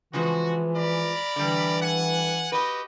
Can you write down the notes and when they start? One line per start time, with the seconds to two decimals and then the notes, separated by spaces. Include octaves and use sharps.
0.13 C#3 E3 F3 G#3 F#4
0.76 A#4 D5 B5
1.36 D3 E3 G3
1.81 F#5 G#5
2.52 F#4 G4 B4 D#5